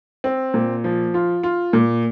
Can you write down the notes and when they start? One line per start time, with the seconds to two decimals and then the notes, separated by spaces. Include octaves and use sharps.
0.24 C4
0.54 A#2
0.84 F3
1.14 F4
1.43 F4
1.73 A#2